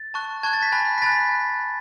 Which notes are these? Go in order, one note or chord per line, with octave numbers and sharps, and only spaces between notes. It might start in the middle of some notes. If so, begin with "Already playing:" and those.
Already playing: A6
A5 C#6 F#6
A5 C#6 F#6 G#6
A6
B6
G#5 B5 F#6 A6
B6
G#5 B5 F#6 A6
B6